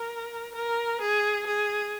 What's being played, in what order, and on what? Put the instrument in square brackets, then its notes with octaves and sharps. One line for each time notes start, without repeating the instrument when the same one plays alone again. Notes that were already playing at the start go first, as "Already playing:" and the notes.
Already playing: [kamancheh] A#4
A#4
G#4
G#4